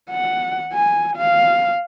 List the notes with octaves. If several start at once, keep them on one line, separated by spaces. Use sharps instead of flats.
F#5
G#5
F5